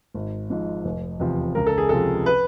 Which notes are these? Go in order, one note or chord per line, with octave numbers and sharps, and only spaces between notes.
G#1
G#2 F3
F1
E2 C3 F3
C#2 A#4
A4
G#4
C3 F3 A4
B4